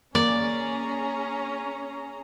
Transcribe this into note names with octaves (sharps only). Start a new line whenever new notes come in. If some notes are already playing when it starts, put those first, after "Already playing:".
A#3 C#4 G#4 D5 A#5